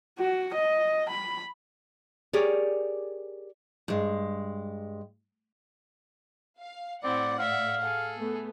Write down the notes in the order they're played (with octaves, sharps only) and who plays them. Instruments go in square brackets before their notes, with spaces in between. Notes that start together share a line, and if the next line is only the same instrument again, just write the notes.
[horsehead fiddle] F#4
D#5
B5
[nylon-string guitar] G4 G#4 A#4 C#5 D5
[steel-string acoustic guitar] G2 G#3
[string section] F5
[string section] A2 F#5 [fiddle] C4 E4 [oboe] D5
[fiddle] D5 E5 [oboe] F5
[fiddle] G#4 A4
[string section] A3 B3